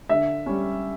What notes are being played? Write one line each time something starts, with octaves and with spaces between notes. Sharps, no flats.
D3 E5
G3 C#4